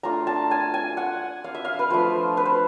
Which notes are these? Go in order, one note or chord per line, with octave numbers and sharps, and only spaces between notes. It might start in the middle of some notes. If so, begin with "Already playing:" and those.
A3 D4 F4 A#5
A5
G#5
G#5
F#5
F5
E5
F5
B4
F3 A3 D4 F4 C5
B4
C5